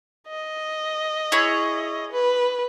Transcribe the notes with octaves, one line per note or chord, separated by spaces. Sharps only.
D#5
E4 G#4 C#5
B4